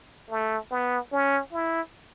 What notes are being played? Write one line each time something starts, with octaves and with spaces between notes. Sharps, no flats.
A3
B3
C#4
E4